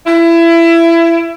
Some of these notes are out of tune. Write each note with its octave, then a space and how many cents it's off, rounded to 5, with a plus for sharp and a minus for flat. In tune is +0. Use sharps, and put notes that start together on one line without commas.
E4 +25